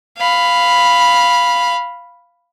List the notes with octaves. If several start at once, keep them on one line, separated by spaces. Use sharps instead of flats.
F5 B5